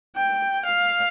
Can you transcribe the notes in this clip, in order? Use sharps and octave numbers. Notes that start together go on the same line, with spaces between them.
G5
F5